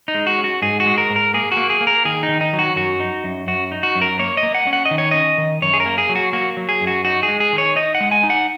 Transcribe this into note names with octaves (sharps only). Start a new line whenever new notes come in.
D#4
G#3
F#4
C#4
F#4
G#2 G#4
F#4
G#3
A#4
G#2
A#4
A#3 G#4
F#4
A#3
G#4
A#3
A#4
D#3 G#4
D#4
D#3
D#4
F#3
F#4
F#2 F#4
D#4
F#2
F#2 F#4
D#4
F#4
F#2
A#4
A#3 C#5
D#5
A#3
F#5
C#4
F#5
D#5
D#3
C#5
C#4 D#5
D#3
F#2 C#5
G#4
A#4
A#3
G#4
F#3
F#4
A#3 F#4
F#3
G#4
F#2
F#4
D#4 F#4
G#4
G#3
G#4
D#3
C#5
D#4 D#5
F#5
G#3
G#5
D#4
F#5